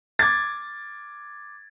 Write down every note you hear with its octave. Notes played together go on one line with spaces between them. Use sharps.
D6 G#6 A6